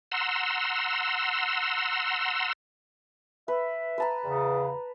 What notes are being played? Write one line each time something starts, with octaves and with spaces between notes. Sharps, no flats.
F#5 A#5 C6 E6
B4 E5
B4 A5 A#5
E2 C#3